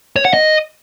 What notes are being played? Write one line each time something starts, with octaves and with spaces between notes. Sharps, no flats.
C#5
F#5
D#5